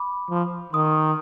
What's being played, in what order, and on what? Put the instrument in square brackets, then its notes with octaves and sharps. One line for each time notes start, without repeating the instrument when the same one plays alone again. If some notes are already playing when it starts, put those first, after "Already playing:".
Already playing: [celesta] B5 D6
[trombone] F3
[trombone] D#3 [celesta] C6 D#6